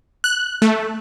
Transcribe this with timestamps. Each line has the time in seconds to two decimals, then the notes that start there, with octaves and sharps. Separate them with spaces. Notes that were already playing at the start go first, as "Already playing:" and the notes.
0.24 F#6
0.62 A3